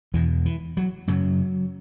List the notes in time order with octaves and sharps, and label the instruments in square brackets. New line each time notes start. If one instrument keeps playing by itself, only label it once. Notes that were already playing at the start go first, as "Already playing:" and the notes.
[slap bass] E2 B2 E3
E3
F#3
F#2 C#3 F#3